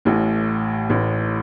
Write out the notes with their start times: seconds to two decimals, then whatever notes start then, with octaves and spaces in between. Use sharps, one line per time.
0.05 A1 A2
0.90 A1 A2